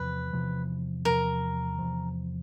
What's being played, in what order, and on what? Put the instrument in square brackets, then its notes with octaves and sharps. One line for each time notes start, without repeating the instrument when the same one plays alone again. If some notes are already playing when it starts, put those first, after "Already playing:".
Already playing: [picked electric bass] E2 C3 F3 [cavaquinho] B4
[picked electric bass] E2 C3 F3
[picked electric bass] E2 C3 F3 [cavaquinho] A#4
[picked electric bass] E2 C3 F3